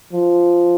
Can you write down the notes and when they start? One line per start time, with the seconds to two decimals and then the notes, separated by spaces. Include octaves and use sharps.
0.13 F3